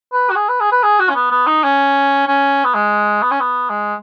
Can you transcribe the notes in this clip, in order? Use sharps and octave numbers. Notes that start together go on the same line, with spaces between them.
B4
F#4
G#4
B4
G#4
B4
G#4
F#4
C#4
B3
B3
D#4
C#4
C#4
B3
G#3
B3
C#4
B3
G#3